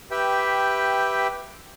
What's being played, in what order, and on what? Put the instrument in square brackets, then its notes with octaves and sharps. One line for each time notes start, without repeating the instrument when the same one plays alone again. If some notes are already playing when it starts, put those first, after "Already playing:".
[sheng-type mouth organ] G4 B4 E5 G5